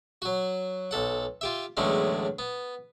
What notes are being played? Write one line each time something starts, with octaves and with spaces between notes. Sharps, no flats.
F#3 F#4
B1 A4 F#5
F4 G4 E5
E2 A2 D3 F#3 G#3 C#4
B3